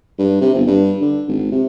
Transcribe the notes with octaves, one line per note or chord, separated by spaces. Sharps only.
G2
C3
G1
G2
D3
G#1
C3